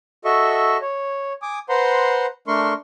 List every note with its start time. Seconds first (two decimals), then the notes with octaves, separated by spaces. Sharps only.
0.25 F#4 A4 D#5 E5 C#6
0.81 C#5
1.42 G#5 D6 D#6
1.69 B4 C5 F#5 A#5 C6
2.48 A3 D4 A#4 C6 C#6